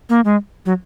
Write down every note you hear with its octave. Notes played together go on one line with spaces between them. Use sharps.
A#3
G#3
F#3